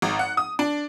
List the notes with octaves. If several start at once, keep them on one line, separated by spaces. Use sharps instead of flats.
G#1
F#5
D#6
D4